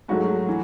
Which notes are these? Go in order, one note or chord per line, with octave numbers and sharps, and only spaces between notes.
G#2 F#3 A3 F#4
E3